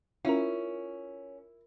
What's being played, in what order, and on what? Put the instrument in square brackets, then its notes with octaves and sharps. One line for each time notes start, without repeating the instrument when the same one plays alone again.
[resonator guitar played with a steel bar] C#4 [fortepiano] E4 [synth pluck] F4 A#4